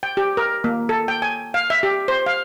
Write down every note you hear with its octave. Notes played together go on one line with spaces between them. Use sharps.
G5
G4
A#4
A#3
A4
G5
G#5
F5
E5
G4
C5
F5